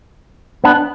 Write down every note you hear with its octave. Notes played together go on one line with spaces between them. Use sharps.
B3 D4